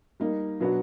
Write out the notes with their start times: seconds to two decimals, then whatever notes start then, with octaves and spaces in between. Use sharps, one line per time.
0.20 G3 A#3 D#4
0.60 B2 F#3 B3 D4 F#4